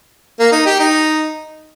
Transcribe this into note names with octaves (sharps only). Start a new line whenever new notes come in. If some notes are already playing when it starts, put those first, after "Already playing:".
A#3
D#4
G4
D#4